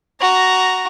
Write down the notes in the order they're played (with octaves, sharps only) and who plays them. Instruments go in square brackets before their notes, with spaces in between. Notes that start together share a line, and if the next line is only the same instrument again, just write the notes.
[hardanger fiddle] F#4 A#5